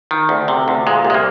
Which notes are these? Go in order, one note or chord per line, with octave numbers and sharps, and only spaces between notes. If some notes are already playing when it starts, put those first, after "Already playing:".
D#3
D2
C3
D2
A#2 G#3
C2
G#3
A#3